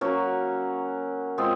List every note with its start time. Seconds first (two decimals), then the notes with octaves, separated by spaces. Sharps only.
0.01 F#3 A#3 C#4 F#4
1.38 G#3 C4 F4 G#4